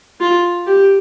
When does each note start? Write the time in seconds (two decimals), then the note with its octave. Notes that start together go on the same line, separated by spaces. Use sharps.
0.21 F4
0.67 G4